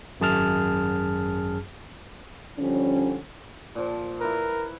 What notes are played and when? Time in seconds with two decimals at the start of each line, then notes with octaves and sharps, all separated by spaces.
0.20 G#1 F#2 G#4 A5 F6
2.59 D3 F3 G3 C#4
3.75 A#2 F3
4.21 E4 A#4 B4